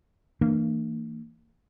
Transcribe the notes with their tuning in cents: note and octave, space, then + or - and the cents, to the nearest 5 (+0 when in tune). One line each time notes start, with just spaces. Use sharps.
E3 -20 A#3 -40 D4 +30